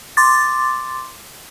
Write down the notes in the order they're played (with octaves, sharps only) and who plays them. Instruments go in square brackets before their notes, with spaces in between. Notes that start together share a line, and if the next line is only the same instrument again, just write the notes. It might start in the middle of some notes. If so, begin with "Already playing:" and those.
[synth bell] C6 D6 A6